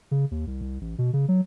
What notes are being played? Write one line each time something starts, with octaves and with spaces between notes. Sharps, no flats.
C#3
D#2
C2
C2
A1
B2
C#3
F#3